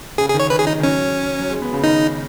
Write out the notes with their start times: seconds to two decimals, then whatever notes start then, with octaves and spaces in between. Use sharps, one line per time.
0.18 C#3 G#4
0.29 G#4
0.34 D#3
0.39 C#5
0.50 D#3 B4
0.59 G#4
0.67 D#4
0.80 D#3
0.83 F#3 C#4
1.39 F#3
1.50 G#3
1.62 B3
1.73 C#3
1.83 D#3 D#4